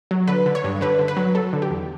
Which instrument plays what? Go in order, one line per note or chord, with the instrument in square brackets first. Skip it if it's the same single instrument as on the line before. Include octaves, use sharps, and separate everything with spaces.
[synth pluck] F#3
D3 B4
D3
C#5
G2
D3 B4
D3
B4
F#3
F#3 A4
D3
G4
E2